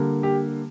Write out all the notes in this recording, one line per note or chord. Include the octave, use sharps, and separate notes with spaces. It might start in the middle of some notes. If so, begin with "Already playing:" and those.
Already playing: D3 G3 A#3
G4